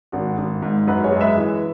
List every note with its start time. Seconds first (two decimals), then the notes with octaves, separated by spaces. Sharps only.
0.12 G#1 F#4
0.38 G#1
0.62 G#2
0.87 F#2 F#4 B4
1.04 G#4 C#5
1.12 G#3
1.21 B4 E5
1.37 E3